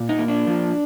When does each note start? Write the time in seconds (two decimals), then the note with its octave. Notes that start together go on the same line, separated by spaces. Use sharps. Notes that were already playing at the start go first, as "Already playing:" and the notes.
Already playing: A#2
0.09 D#4
0.19 A#3
0.28 D4
0.47 F3